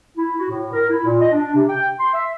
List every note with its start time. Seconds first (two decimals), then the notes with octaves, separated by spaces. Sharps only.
0.17 E4
0.39 F#4
0.50 A2
0.73 A#4
0.90 E4
1.05 A#2
1.21 D#5
1.32 D4
1.55 C3
1.69 G5
1.99 C6
2.14 E5